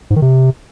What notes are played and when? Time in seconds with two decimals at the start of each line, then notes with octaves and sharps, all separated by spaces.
0.10 G#2
0.16 D#3
0.22 C3